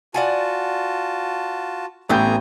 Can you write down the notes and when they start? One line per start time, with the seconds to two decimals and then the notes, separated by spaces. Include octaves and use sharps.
0.14 F4 F#4 D5 F#5 G#5 A5
2.09 A1 B3 C4 A4 G5 G#5 A#5 G6